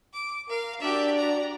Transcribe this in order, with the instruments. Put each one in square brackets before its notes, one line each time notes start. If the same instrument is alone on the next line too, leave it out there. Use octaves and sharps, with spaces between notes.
[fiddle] D6
[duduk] A#4 [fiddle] F5
[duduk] D4 [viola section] F#4 D5 [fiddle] G4 E5
[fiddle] A#5